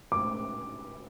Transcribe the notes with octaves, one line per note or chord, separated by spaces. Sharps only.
D6